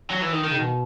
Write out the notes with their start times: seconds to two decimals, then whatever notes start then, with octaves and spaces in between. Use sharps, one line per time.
0.11 F#3
0.22 E3
0.33 D#3
0.44 D#3
0.51 C#3
0.55 B2